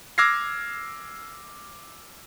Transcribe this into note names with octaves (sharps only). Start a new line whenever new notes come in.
D6 E6 F6 G#6 A#6 C7